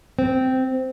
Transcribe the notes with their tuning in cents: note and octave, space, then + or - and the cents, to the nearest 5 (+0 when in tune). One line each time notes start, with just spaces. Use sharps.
C4 -10